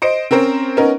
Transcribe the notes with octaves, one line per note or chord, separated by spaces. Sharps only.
C5 D#5 D7
C4 C#4 A#4 C5
B3 C#4 D#4 A#4